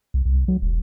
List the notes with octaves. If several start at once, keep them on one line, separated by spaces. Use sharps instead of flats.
C2
C2
F#3
E1